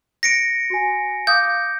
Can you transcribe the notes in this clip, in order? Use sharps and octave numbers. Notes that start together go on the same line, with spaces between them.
A#6 C#7 D7
F#4 G#5
F5 D6 D#6 G6